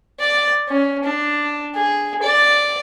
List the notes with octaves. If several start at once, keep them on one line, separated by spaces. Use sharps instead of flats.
D5
C#4
D4
G#4
D5